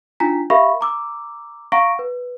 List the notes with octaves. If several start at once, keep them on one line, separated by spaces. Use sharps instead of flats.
D4 D#4 F4 G#5 A#5 B6
G4 A#4 E5 F5 B5 C#6
A#5 D6 E6
F5 F#5 A#5 C#6 A#6 D7
B4